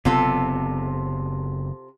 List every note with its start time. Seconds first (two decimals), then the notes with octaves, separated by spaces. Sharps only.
0.05 F#1 C3 B3 C4 F4 A4